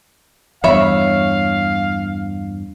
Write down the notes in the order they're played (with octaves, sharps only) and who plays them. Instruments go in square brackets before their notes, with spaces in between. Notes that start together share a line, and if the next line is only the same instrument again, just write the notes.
[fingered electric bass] E2 G2 [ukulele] C#5 [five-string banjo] E5 B5 [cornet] F5